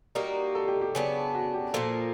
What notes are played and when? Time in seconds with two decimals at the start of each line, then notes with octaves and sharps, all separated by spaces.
0.15 G3 A#3 D#4 F#4 A#4
0.55 A4
0.68 G4
0.81 G4
0.95 C#3 F#3 B3 D4
1.35 F#4
1.54 G4
1.74 A#2 F3 A#3 A4